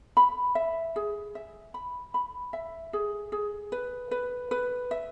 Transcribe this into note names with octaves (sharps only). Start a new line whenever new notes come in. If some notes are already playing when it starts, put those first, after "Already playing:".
B5
E5
G#4
E5
B5
B5
E5
G#4
G#4
B4
B4
B4
E5